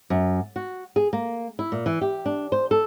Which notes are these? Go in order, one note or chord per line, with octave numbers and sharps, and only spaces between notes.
F#2
F#4
G#4
A#3
E4
A#2
E3
G4
D4
C5
A4